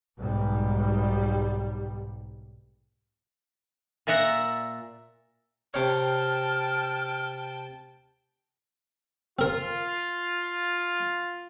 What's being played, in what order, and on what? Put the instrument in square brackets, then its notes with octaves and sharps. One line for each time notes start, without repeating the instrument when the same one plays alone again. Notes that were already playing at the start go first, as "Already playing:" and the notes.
[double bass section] B1 G#2 G3
[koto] A#2 D5 E5 F#5 A#5
[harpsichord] C3 C#5 [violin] G5 A5 [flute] F6
[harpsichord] C4 A#4 [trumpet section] F4